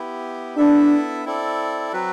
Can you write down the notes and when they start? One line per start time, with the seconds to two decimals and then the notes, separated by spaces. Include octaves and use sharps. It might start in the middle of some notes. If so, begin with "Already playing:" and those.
Already playing: B3 E4 G4
0.57 B3 D4 E4 A4 E5
1.25 C4 E4 A4 D5
1.93 F#3 C4 F#4 B4